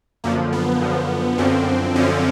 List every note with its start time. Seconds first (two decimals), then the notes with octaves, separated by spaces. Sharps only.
0.24 F#2 D3 F3 A#3
0.53 B3
0.81 F#2 D3 F3
1.38 F#2 D3 F3 C4
1.96 F#2 D3 F3 C#4